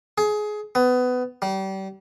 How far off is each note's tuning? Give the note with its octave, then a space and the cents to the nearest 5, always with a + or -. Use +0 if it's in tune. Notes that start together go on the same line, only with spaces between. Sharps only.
G#4 +20
B3 +20
G3 -30